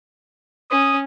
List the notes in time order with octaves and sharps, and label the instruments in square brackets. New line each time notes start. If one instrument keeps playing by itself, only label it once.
[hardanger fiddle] C#4 [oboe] D#6